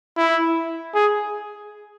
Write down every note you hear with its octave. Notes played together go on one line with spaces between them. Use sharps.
E4
G#4